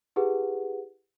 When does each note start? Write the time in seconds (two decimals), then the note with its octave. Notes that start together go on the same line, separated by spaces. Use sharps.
0.16 E4 G4 G#4 B4 F#5